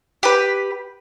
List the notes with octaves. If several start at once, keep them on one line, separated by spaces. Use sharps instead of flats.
G4 B4